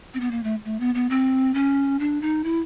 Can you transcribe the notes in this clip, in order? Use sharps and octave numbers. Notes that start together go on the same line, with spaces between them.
C4
B3
A#3
A3
A3
B3
B3
C4
C#4
D4
D#4
E4